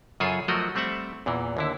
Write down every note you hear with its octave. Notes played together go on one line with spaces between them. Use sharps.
F#2 C#3 F4 G#4 A4 G#5
F3 F#3 A3 F#4 A#4 D#5
G3 A3 C4 E5 F#5
E2 A#2 E3
D#2 D3 E4